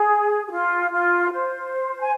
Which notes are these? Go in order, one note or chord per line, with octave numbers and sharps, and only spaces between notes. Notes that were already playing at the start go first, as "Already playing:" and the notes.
Already playing: G#4
G#4
F4
F4
C5
G#5